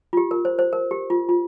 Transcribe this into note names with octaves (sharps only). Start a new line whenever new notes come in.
F4
G4
A#4
C5
C5
A#4
G4
F4
F4